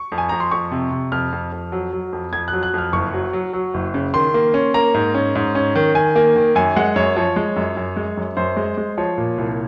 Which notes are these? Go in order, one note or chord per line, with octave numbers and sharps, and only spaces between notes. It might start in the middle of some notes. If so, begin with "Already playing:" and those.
Already playing: C#6
F2
G#5
F2 A#5
C6
F2 C#6
C3
C3
F2 F6
F2
F2
F#3
F#3
F2
F2 G#6
F#6
F#3
F#6
F2 F6
F#1 C#6
F#3
F#3
F#3
F#1
C#3
D#3 C6
A#3
C#4
A#3 A#5
G#2
C#4
G#2
C#4
D#3
D#3 G#5
A#3
D#3
F#2 G#5
G#3 F#5
F#2 C#5
F3 C#5
G#3
F#2
F#2
G#3
F#2
F#2 C5
G#3
G#3
F3 C#5
A#2
C2